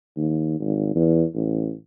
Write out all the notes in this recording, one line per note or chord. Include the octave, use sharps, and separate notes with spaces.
D#2
G#1
E2
A1